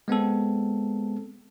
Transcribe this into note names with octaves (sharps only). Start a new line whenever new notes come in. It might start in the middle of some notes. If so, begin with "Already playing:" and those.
G#3 B3 C4 A4